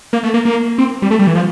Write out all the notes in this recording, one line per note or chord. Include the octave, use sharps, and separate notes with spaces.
A#3
A3
A#3
A#3
C4
G3
A3
G3
E3
F3